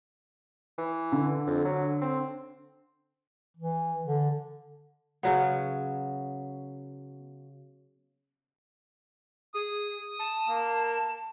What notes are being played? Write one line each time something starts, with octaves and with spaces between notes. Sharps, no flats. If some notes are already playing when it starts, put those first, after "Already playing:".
E3
D3
F2
F#3
C4
E3
D3
C#3 F#3 B3
G#4 D#6
A5
A#3